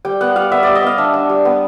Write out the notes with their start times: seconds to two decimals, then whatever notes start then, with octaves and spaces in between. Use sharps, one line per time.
0.05 G3 G5
0.21 B3 F#5
0.36 G3 F5
0.52 B3 E5
0.63 G3 D5
0.75 D#5
0.83 B3 F5
0.98 D4 E5
1.14 D4
1.29 G3
1.45 B3